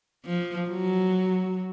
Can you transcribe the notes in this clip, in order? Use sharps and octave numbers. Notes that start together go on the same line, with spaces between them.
F3
F#3